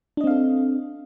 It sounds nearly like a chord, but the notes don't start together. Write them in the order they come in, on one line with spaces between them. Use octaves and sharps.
D4 D#5 C4 F5 A4